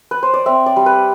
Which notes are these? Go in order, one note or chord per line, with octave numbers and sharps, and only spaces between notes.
B4
C5
D5
C4 E5
D5
G3
B4